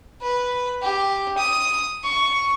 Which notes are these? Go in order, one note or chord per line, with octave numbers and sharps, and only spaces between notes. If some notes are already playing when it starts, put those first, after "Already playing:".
B4
G4
D#6
C#6